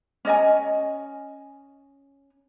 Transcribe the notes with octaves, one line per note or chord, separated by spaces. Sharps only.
C#4 D#5 G#5